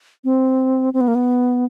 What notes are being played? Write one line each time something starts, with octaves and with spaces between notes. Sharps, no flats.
C4
C4
B3
A#3
B3